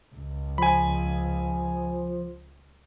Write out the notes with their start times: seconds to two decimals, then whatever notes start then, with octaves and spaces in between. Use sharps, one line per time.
0.15 C#2
0.58 F3 G#5 B5